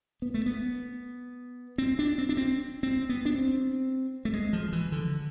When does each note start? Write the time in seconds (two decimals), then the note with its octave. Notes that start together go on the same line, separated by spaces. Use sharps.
0.22 B3
0.34 A3
0.46 B3
1.78 C4
1.99 D4
2.18 C4
2.29 D4
2.37 C4
2.83 C4
3.09 B3
3.25 D4
3.35 C4
4.25 A3
4.33 G#3
4.53 F3
4.72 E3
4.92 D3